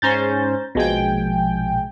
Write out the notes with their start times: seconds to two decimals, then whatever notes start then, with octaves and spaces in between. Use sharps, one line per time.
0.02 G#2 C#4 C5 A#5 G6 A6
0.75 A#1 B2 G#3 G5 G#5